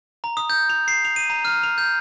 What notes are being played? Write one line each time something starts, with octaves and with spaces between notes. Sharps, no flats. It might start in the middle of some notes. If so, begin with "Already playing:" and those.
A#5
D#6
G6
F7
C7
F7
D#7
A#5
F6
F7
G6